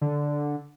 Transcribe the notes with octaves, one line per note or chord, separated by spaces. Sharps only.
D3